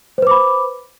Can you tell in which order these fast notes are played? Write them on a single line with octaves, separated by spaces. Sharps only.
C5 B4 D6 B5